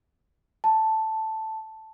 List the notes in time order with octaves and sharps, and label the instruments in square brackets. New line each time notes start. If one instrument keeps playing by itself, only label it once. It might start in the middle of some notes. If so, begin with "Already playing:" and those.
[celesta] A5